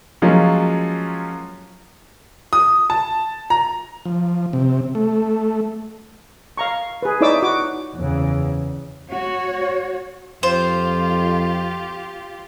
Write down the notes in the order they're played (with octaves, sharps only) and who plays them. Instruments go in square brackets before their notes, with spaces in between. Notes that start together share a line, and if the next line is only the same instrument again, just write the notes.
[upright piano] F3 F#3 G#3 A#3 C#4 F4
D#6
A5
A#5
[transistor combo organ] F3
C3
A3
[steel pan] F5 A#5 C#6
G#4 B4
D#4 E4 C#5 D5 D6 E6
F#4 D6
[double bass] E2 C#3
[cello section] F#4 C#5
[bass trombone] F2 [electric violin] F4 G4 [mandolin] C5